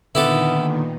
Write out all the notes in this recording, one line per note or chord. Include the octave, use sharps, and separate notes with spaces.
A#2 D3 D#3 B3 E4 G4 A4 F#5